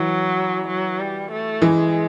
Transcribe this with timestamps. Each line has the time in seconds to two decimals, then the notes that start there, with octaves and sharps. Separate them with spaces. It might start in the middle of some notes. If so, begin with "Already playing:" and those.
Already playing: E3 F#3
0.68 F#3
1.00 G3
1.31 A3
1.62 E3 G#3